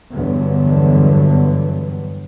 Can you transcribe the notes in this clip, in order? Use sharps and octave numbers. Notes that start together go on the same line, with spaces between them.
E2 G2 D3 F#3 B3